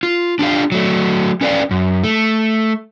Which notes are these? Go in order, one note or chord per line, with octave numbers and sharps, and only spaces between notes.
F4
D4 F4 G4 F5
F#3 A3
C#4 A4 B4 D5 F5
F#2
A3